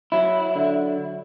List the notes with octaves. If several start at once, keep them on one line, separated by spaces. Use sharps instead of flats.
F#3 E4
D3